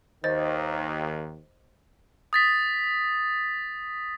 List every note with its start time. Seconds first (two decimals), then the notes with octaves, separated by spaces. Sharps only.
0.24 D#2 D#3 C5 D#5 A6
2.33 D#6 A6 B6